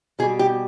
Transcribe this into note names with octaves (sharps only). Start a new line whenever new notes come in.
B2 G3 G#4
G4